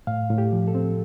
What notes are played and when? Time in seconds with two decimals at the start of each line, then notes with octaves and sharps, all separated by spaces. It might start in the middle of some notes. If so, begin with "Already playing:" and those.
0.07 A2 F5
0.30 A2
0.38 G4
0.53 F3
0.68 A4
0.75 C4